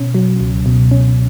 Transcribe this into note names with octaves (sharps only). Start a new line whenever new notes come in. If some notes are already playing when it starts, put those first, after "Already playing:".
Already playing: B2 C#4
F#3
C#2
B2
C#4